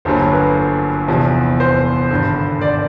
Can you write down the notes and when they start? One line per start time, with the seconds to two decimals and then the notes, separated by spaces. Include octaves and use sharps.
0.05 G1 G2 D3 F#3 A#3 C5
0.32 B4
1.08 E2 C3 F3
1.60 C5
2.10 G#1 G2 D3
2.61 D5